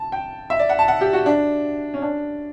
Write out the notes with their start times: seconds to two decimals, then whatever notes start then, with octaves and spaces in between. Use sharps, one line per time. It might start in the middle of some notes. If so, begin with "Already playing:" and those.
Already playing: A5
0.12 G5
0.50 E5
0.59 D5
0.69 F#5
0.79 A5
0.88 F#5
1.01 G4
1.13 F#4
1.26 D4
1.94 C#4
2.02 D4